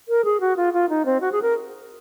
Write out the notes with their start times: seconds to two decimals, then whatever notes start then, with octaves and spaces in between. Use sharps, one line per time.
0.09 A#4
0.25 G#4
0.40 F#4
0.57 F4
0.74 F4
0.89 D#4
1.06 C4
1.21 F#4
1.32 G#4
1.42 A#4